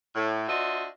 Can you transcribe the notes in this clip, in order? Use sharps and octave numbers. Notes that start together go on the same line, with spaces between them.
A2
D4 F4 F#4 C5 D#5 E5